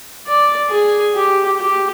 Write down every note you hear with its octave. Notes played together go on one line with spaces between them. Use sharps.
D5
G#4
G4
G4